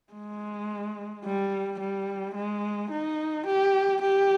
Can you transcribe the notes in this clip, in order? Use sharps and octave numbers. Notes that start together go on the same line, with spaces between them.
G#3
G3
G3
G#3
D#4
G4
G4